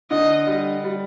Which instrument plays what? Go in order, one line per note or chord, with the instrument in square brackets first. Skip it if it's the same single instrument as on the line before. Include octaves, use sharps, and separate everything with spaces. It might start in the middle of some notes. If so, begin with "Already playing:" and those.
[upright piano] D3 [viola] D#5
[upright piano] G3
G3